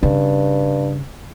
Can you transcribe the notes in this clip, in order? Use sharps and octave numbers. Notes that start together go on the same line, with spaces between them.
G2 C#3